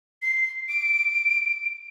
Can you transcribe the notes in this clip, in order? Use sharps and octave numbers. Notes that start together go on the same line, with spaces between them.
C7
D7